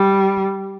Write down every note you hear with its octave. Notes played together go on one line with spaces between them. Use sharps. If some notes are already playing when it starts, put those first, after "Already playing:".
Already playing: G3